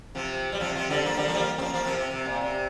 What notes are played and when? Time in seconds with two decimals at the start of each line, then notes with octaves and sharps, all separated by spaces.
0.15 C3 F3
0.52 G3
0.60 C3 F3
0.75 C3 F3
0.90 D3 G3
1.05 F3 A#3
1.17 D3 G3
1.28 F3 A#3
1.35 G3
1.40 F3 A#3
1.58 C4
1.61 F3 A#3
1.74 F3 A#3
1.84 C3 F3
1.96 C3
2.11 C3
2.26 A#2
2.41 C3